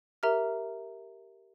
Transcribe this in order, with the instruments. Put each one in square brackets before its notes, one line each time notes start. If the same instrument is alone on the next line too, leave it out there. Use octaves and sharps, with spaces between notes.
[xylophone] G4 A#4 E5 A#5 F6